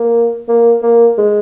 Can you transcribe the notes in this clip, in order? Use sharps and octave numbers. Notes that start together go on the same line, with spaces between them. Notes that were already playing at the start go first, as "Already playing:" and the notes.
Already playing: A#3
A#3
A#3
G#3